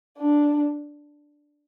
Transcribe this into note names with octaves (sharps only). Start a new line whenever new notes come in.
D4